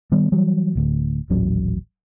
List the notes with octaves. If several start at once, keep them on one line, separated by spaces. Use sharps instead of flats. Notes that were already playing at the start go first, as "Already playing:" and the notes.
D#3 G3 B3
E3 F#3 G3
D1 D2
D#1 A1 F#3 C#4